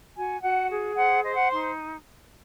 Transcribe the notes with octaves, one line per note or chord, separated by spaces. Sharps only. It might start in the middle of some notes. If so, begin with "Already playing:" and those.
F#4 G#5
F#4 F#5
G#4
C5 F#5
C5 D#5
F#5
D#4 C6